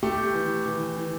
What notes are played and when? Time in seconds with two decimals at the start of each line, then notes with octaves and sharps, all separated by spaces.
0.03 A3 G4
0.33 E3
0.66 E3
0.96 E3